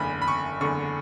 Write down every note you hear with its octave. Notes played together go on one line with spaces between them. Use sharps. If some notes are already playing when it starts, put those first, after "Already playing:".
Already playing: F#1 E2 D3 B5
B5
C#6
F#1 E2 D3 C#6